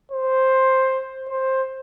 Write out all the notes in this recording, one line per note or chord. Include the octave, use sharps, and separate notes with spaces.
C5
C5